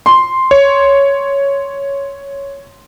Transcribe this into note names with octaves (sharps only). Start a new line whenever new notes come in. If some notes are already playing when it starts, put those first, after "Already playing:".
C6
C#5